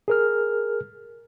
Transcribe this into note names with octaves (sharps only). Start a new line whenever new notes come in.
G#4 A#4 F6